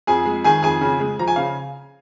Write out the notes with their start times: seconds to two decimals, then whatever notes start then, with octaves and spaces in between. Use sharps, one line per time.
0.07 F2 G#4 G#5
0.25 G#3
0.44 D#3 G#4 G#5
0.63 F2 G#4 G#5
0.81 C#3
1.00 G#3
1.19 F3 A#5
1.28 G#5
1.36 C#3 F5